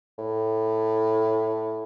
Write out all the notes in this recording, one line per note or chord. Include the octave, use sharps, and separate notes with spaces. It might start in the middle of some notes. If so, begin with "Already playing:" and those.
A2